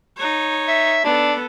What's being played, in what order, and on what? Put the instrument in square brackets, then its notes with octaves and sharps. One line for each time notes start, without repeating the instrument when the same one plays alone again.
[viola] D#4 C#5
[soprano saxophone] E5
[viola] B3 A4 [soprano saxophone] D4